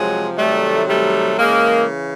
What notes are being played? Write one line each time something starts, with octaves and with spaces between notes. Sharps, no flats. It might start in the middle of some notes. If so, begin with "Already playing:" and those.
Already playing: C3 F3 F#3 G#3
C3 D#3 F#3 G3 A3
G3 A3
C#3 E3 G#3 A#3